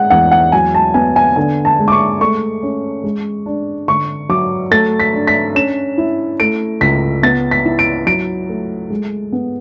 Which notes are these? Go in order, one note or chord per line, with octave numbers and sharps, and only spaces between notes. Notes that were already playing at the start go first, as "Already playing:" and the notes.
Already playing: G#3 F#5
E2 F#5
F#5
F#3 G#5
A5
B3 G#5
G#5
D3 G#5
A5
G#3
D6
C#6
A3 C#6
C#4
G#3
D4
D3 C#6
F#3 D6
A3 A6
B6
D4
B6
C#4 E7
E4
A3 D7
C#2 B6
B3 A6
B6
E4
D7
F#3 D7
A3
G#3
B3